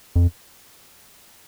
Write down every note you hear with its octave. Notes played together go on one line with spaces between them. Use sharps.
F2